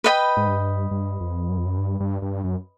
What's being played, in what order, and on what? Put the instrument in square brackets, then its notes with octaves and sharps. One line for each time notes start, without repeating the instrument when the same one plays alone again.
[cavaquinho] B4 D#5 G5 B5
[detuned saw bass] G#2
G2
G2
F2
F#2
F2
F#2
G2
G2
G2
F#2